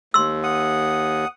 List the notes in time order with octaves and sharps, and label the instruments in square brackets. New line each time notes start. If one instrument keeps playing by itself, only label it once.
[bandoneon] D#2 [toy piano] C6 E6
[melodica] F#5 D#6